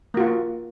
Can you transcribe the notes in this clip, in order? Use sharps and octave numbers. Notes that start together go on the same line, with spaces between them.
A#3 F4 F#4